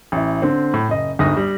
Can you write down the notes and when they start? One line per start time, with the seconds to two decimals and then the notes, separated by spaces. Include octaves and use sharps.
0.12 A1 E4
0.42 D3 C4
0.74 A2
0.88 F#1 D#5
1.19 G1 D2 G#2 D#6 A#6
1.37 G3